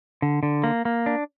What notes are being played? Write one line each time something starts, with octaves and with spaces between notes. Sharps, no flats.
D3
D3
A#3
A#3
D4